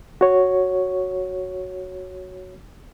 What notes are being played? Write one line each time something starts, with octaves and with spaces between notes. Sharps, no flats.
F#4 C#5